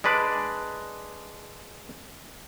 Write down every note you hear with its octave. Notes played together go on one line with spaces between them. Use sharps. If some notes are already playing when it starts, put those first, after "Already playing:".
G#3 D4 B4 D5